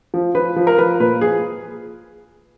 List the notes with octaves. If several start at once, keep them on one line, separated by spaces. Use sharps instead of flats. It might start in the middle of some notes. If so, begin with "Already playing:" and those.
F3
F3 B4
F3
A#4
F3 B4
A#2 B4
F3 G#4